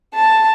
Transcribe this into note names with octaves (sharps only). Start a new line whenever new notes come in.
A5